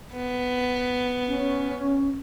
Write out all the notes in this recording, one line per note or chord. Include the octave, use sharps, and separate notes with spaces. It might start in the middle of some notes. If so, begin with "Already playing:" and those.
B3
C#4